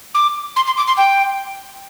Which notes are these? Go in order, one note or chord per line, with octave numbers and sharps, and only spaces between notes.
D6
C6
C6
D6
C6
G5